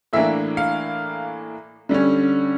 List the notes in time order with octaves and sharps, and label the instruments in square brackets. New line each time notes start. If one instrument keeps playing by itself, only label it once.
[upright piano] A2 E3 A#3 D4 E5
F5
D3 G3 C#4